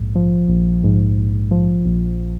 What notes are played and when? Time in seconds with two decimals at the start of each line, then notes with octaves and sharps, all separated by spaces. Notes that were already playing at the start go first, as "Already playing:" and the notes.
Already playing: A#1 G#2
0.15 F3
0.48 A#1
0.84 G#2
1.17 A#1
1.51 F3
1.85 A#1